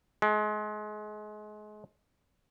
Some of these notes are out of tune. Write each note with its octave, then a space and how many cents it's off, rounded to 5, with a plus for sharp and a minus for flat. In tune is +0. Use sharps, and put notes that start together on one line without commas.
G#3 +30